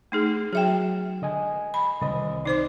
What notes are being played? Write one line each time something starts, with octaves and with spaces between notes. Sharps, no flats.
A3 D#4 G#4
F#3 G#4 E5 G5
D3 D#5 G#5
B5
C2 D#3 D#5
D#4 C5 D5 D6